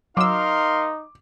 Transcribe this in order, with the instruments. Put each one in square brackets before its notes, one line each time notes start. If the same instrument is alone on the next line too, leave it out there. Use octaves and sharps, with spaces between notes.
[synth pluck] F#3 E6 [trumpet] D#4 [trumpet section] A#4 F5 C6 [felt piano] D6